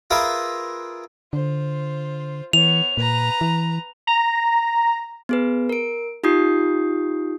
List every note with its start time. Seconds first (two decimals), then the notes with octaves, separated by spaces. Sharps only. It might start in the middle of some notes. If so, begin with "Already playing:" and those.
0.10 F4 G#4 A#4 B4 E5 D6
1.33 D3 F4 C5
2.53 E3 B3 C#5 F7
2.97 A#2 B4 A#5
3.41 E3
4.07 A#5
5.29 B3 G#4 B4
5.69 A#4 D7
6.24 D#4 F4 G4 D#6 G6 C7